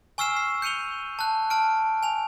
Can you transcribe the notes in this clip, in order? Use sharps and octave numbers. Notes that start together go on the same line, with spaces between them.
G#5 C#6 E6 F6 C7 E7
C7
G6 C#7 D#7 F7 G7
A5 F#6
A5 F6 D7
G#5 F7